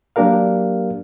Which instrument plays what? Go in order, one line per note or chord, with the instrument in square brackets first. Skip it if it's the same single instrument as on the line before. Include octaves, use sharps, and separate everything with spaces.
[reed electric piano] F#3 A#3 D4 G4 A#4 F5